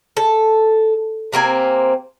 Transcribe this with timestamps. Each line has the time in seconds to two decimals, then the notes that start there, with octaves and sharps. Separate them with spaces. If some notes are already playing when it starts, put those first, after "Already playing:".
0.17 A4
1.32 C3 A#3 C4 G#5